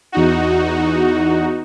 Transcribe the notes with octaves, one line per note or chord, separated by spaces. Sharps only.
E2 D#4 F#4